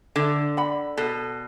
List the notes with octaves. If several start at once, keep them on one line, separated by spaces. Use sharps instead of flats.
D3 A4
D5 F#5 B5
B2 A4